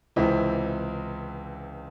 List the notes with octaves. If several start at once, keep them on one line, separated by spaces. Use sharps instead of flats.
C#2 C3 E3 C4 E4